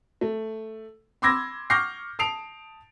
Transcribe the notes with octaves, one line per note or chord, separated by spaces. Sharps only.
A3
B5 C6 D6 E6 G#6 A#6
C#6 D6 F6 G6 A#6 C7
A5 D#6 C7 D7 F7